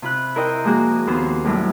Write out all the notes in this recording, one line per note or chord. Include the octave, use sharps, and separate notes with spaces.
C3 F4 B5 F#6
E4 A#4 C5 D#5 G5
F3 G#3 A#3 F#4 G#4
D#2 B3 C4 C5
F#2 A2 F#3 G3 E4